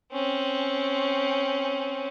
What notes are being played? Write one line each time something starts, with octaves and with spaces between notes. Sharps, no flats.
C4 C#4